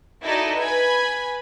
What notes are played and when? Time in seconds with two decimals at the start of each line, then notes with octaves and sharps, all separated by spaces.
0.23 D#4 E4 F#4 A4 D5 D#5
0.57 B4 G#5 B5 G#6